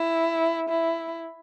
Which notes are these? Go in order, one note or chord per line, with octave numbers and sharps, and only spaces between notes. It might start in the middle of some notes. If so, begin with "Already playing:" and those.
Already playing: E4
E4